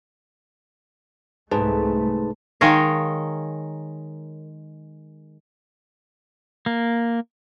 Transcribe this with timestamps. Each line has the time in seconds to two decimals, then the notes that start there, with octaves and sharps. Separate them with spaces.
1.51 C2 G#2 A3 G#4 B4 A5
2.61 D#3 G#3 A#4 C#5 F5
6.66 A#3